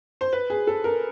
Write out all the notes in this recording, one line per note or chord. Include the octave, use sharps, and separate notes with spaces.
C5
B4
G#4
A4
A#4